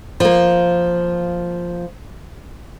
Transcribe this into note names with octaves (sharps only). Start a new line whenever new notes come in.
F3 A#3